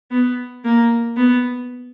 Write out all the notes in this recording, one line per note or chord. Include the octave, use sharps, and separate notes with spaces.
B3
A#3
B3